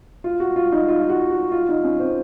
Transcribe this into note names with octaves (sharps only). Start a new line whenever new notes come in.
F4
F#4
F4
D#4
F4
F4
F#4
F#4
F4
D#4
C#4
C4